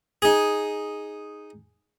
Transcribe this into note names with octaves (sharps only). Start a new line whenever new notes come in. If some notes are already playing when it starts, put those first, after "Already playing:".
D#4 G#4